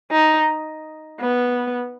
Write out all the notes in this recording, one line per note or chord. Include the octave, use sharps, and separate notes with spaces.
D#4
B3